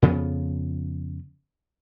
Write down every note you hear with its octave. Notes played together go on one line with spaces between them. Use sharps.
F2 C#3 F3 B3